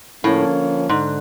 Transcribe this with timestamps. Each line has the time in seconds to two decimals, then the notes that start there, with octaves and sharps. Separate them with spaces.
0.24 A2 D3 F3 A#3 C#4
0.89 G#2 D3